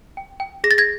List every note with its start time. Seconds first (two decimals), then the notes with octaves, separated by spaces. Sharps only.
0.17 G5
0.40 G5
0.64 G#4 A#6
0.71 A6
0.78 G#6 A#6